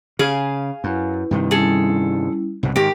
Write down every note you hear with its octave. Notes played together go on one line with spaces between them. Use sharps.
C#3 G#4 F5 G#5
F#2 E4 B4
G2 C3 D#3
G3 C#4 E4 G#4 A4
C2 G#2 B2
G#2 D#3 G4 A#4